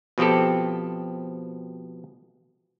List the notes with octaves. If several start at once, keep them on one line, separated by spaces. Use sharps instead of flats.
B2 F3 C4 G4 A4